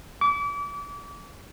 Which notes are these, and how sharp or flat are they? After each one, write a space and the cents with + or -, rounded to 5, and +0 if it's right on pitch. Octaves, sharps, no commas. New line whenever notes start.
D6 -35